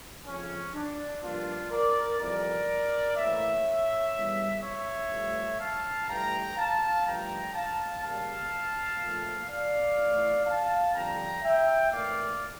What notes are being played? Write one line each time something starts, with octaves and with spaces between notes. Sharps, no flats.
F2 C#3 F3 C#4
D4
G2 F3 A#3 D4 F4
A#4 D5
F2 E3 G3 A#4 D5
A2 E3 A#3 C#5 E5
E2 C#3 G3
C#5 E5
G2 F3 A3
F5 A5
G2 E3 A3 G5 A#5
F5 A5
G2 F3 A3 G5 A#5
F5 A5
C#3 G3 A#3 F5 A5
A#2 F3 A3
D5 F5
A2 E3 A3
F5 A5
F2 D3 G3 G5 A#5
E5 G5
A2 E3 A#3 D5 F5